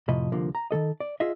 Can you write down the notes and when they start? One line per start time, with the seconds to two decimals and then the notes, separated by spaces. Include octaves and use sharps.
0.09 F2 A2 C3 F3 D#5 B5
0.32 C2 D3 F3 A#3
0.55 A#5
0.71 D#3 F3 A4 D#5
1.00 D5
1.20 F4 G#4 D#5 E5